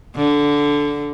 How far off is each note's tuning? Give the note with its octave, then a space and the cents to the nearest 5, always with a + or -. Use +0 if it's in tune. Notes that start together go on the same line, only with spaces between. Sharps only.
D3 -10